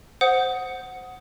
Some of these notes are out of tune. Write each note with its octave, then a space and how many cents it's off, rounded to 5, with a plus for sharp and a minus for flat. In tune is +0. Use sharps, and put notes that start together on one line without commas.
C5 +0 F#5 +0 D#6 +10